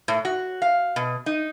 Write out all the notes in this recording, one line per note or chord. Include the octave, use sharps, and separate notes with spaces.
A2
F#4
F5
B2
D#4